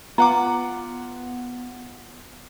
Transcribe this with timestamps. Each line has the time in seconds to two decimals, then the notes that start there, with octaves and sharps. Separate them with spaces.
0.18 B3 F4 F#5 A#5 D6